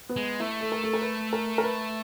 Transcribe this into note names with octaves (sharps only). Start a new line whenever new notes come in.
B3
G#3
A3 E4
A4
A#4
A4
A#4
B4
A#4
A#4
B4